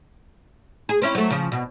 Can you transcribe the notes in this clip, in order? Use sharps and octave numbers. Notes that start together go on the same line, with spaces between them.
G#4
C4 C#4 E4
F#3 A3
C#3 F3
B2